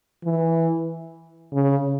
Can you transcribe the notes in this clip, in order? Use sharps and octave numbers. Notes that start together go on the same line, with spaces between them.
E3
C#3